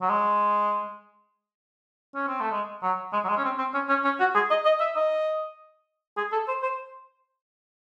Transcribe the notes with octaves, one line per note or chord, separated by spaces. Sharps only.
F#3
G#3
C#4
C4
A3
G#3
F#3
G#3
F#3
G#3
C#4
C4
C4
C#4
C#4
C#4
F#4
G#4
D#5
D#5
E5
D#5
G#4
A4
C5
C5